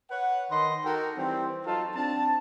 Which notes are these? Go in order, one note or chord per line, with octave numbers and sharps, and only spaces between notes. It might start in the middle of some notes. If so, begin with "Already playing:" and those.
B4 C#5 F#5
D#3 D#5 B5 C6
D#4 F#4 A4 A#4 G5
E3 G3 C4
F#3 D#4 F4 A4 A5
C4 D4 A5